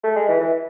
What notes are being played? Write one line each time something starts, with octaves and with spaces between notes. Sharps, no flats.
A3
G#3
E3
E3